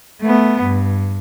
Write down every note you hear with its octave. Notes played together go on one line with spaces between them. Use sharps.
A3 B3
G2